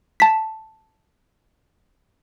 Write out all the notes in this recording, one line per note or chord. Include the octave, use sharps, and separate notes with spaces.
A5 B6